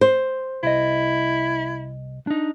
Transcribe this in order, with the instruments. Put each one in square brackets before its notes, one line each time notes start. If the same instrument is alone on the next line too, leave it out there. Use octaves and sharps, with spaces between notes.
[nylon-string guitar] C5
[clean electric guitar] C2 D#5 [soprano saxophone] E4
[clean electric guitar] D4 D#4